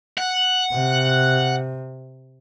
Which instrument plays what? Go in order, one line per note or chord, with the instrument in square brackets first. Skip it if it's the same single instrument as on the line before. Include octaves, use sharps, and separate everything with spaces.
[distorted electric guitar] F#5
[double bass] C3